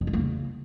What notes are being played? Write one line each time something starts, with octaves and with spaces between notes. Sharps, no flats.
F2
A3
A#3
C#3